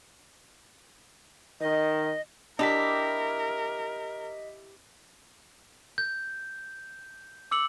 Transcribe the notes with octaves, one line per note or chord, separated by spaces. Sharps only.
D#3 D#5
D4 E4 G4 A#4 D#5 B6
G6
D6 E6 C#7 F#7